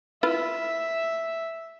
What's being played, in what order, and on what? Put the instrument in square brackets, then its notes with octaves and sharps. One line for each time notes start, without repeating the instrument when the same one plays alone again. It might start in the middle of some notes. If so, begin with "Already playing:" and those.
[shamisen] E4 F4 B4 [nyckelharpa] E5